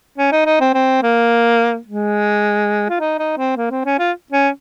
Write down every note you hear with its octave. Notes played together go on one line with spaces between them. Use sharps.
C#4
D#4
D#4
C4
C4
A#3
G#3
F4
D#4
D#4
C4
A#3
C4
C#4
F4
C#4